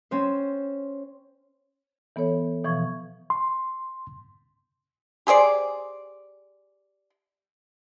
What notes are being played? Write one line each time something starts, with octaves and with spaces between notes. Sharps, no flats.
C4 C#4 C5
E3 B3 A4 C#5
B2 E3 F3 C#6 G#6
C6
G4 G#4 C5 D5